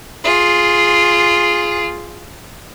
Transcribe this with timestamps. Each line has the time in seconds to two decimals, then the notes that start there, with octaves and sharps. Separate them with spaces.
0.24 F4 G#4